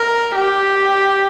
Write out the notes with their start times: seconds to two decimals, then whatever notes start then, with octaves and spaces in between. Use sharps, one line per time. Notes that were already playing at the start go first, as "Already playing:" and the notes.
Already playing: A#4
0.36 G4